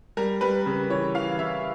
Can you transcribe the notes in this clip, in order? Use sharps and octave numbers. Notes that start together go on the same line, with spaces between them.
G3 A#4
G3 B4
C#3
E3 C#5
E3 F5
C#3 E5